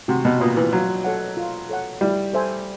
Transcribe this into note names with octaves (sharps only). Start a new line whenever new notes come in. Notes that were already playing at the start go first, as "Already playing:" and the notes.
C3 F#4
B2
A#2 B4 D#5
E3
F#3 F4
A4 C#5 F#5
F4
A4 C#5 F#5
G3 E4
A4 C5 E5 G#5